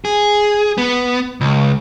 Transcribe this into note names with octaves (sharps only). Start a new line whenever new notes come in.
G#4
B3
C#2